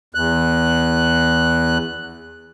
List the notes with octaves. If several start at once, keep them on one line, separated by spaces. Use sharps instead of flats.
E2 F#6